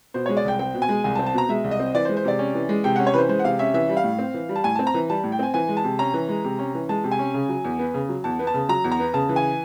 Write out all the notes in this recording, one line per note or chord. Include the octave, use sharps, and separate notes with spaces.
B2 C5
G#3 C#5
D5
C2 G5
C4 G5
B2
G#5
G#3
C2 G#5
A5
C4
A5
B2 A#5
G#3 E5
C2
D#5
C4
E3 D5
C5
G#3
C5
C3 D5
C#4
E3
G#3
C3 G5
C#4 F#5
C#5
E3 B4 C5
G#3 C5
F#5
C3 F5
C#4 E5
E3 E5
G3
F5
A2
C4
E3
G3
A5
A2 G#5
C4 A5
A#5
E3
G3 A5
A2
G5
C4 G#5
E3 G#5
G#3
A5
C3
C#4 A#5
E3
G#3
C3
C#4
E3
G#3 A5
C3
G#5
C#4
C#3
F#3
E2
B3
C#3
F#3
E2 A5
B3
A5
C#3
F#3 A#5
E2
A#5
B3
C#3 A5
E3
G#5